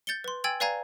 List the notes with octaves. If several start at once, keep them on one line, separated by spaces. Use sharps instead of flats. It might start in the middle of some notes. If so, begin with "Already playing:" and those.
G6 A6 C#7 G7
B4 C6
G5 G#5 E6 G#6 A6 F#7
B4 D5 F5 G#5 A#5 G#6